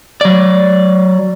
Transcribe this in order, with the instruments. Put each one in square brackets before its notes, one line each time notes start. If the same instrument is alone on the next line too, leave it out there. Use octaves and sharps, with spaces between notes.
[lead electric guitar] F#3 D5